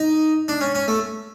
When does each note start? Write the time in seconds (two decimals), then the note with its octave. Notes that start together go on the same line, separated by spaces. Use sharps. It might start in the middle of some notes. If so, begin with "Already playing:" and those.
Already playing: D#4
0.48 D4
0.61 C#4
0.75 C#4
0.88 A3